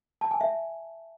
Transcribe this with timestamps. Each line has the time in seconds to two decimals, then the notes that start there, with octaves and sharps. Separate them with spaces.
0.21 A5
0.31 G#5
0.41 E5